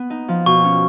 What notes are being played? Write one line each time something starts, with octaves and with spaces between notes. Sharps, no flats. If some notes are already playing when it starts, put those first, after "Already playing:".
Already playing: B3
D#4
F3
B2 C#6
C#4